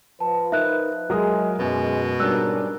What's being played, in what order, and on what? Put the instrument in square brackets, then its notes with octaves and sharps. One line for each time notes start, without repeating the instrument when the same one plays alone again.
[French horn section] F3 B4 [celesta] A5
[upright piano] D#4 A#4 [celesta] E5 F#6
[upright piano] F#3 A#4 D#6 [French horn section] G#3
[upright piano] F#2 [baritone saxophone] B2 [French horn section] G#3
[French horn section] G#2 C#4 A#4 [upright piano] G3 D4 [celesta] E6 F#6